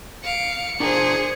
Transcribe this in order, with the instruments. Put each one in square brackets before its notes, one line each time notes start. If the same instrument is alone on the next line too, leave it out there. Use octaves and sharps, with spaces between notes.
[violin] F5 D7 [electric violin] C#7
[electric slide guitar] D4 A#4 A#5 [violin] G#4 C5